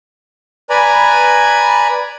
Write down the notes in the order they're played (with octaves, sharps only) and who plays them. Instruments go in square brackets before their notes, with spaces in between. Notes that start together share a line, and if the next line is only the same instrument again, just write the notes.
[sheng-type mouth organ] B4 D5 G#5 A#5 B5